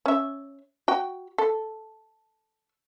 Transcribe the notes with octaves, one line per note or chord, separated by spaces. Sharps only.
C#4 E5
F#4 G5
A4